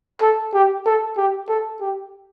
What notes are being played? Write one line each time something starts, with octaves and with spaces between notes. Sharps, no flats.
A4
G4
A4
G4
A4
G4